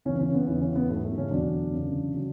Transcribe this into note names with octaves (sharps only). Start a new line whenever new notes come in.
F#2 C#3 E3 C#4
C#3 C#4
B3
E2 C#3 E3 B3
C#3 C#4
B3
G#2 F#3 A3
A3
C#3 C#4
E2 B2 D3 F#3 D4
F#2 C#3 E3
C#3 F#3